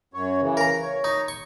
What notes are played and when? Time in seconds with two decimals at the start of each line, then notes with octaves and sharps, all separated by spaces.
0.14 F#2 C#5
0.41 C#3 E3
0.57 A#4 A#5
0.82 C#5
1.04 D#4
1.28 C#6